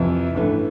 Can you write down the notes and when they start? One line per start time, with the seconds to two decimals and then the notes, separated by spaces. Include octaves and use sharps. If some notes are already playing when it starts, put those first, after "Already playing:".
Already playing: F2 C3 E3 E4 E5
0.35 A1 G2 E3 A3